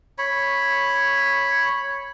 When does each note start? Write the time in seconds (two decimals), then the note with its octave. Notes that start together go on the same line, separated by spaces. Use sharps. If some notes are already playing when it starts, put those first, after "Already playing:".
0.18 C#5 B5